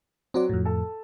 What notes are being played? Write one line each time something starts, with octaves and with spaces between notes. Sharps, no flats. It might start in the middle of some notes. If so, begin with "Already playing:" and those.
F#3 C4 F#4 D5
F2 A2
A4 A5